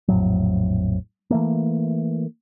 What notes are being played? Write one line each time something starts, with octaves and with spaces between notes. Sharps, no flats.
A#1 F2 A2 F#3
E3 A3 A#3